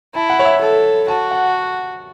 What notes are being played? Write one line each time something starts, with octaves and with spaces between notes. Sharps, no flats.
E4 A5
F#5
C#5
E5
A4
F#4 A5
F#5